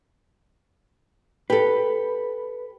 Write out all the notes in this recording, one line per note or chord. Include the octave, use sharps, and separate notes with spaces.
G4 A4 B4